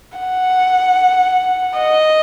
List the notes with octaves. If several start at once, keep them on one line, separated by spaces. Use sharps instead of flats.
F#5
D#5